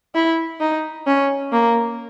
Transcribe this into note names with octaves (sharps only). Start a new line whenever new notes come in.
E4
D#4
C#4
A#3